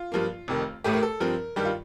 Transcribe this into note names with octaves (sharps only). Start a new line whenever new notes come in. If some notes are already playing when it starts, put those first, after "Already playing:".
Already playing: F4
G2 F3 A#3
F1 F2 D#3
A1 A2 A3 G4
A#4
A4
G2 F3 C4 A#4
G2 D#3 G3 G4
F4